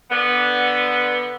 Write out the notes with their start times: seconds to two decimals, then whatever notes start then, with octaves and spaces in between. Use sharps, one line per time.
0.11 D3 B3